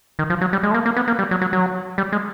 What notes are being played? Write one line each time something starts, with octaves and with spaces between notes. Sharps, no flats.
D#3
F3
F#3
G3
G#3
A3
A#3
A#3
B3
A#3
G3
F#3
F#3
F#3
G3
G#3